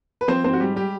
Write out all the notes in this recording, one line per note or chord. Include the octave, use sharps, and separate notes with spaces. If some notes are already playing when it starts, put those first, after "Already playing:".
B4
F3 C4 C5
G#2 C4 C5
F#4
G3 G#3 G4
G3 G4